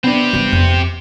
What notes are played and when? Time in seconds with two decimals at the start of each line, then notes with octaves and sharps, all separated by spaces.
0.04 B3 C4 D4 G4
0.33 G2 G3
0.53 F2